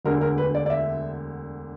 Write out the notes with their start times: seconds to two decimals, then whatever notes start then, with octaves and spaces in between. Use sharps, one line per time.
0.05 E1 D2 D3 A#4
0.21 A#4
0.38 B4
0.55 D5
0.66 D5
0.70 E5